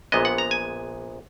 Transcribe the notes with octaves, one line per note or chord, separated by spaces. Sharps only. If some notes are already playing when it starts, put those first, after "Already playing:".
A#1 A#2 G#3 B3 D#5
F#5
A#5
G#5